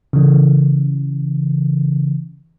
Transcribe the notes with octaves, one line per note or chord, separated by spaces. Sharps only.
C#3 E3